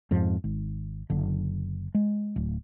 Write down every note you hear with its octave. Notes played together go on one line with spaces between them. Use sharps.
F2 G#2 F3
G#1
F#1 D3
G#3
D1